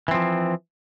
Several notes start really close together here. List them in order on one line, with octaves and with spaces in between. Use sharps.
E3 C4 F3